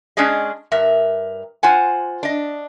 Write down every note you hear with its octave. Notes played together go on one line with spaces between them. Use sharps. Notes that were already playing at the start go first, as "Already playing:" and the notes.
G#3 C#4 D4 G#4 D#5
G2 A#4 E5
F4 C5 F#5 G#5
D4 D#5